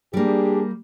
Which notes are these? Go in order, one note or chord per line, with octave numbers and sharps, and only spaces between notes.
G3 A#3 D4 G4 G#4